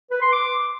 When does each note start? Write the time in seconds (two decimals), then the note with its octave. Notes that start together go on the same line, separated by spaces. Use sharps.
0.11 B4
0.22 C6
0.33 D6